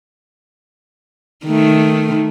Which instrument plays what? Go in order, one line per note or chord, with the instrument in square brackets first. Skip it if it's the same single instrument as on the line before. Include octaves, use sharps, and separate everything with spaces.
[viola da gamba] D#3 A3